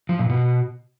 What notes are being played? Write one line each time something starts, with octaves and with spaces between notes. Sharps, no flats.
F3
A#2
B2